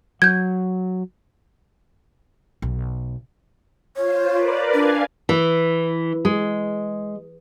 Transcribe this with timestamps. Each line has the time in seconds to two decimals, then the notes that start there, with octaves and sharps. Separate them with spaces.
0.22 F#3 G6 G#6
2.62 B1
3.97 F4 C5 C#5
4.30 A#4 B4 D5
4.74 D4 F5 G#5
5.29 E3
6.25 G#3